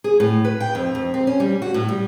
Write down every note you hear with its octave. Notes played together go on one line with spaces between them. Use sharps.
G#4
A2
B4
G5
F2
F2
C4
C#4
G3
F#4
A2
G3